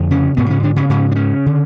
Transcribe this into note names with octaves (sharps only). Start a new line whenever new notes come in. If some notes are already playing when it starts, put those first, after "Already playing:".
Already playing: F2 D3
C#3 C#4
G#2 B2 B3
C#3 C#4
D3 D4
C#3 C#4
G#2 C#3 C#4
D4
C#3 C#4
D3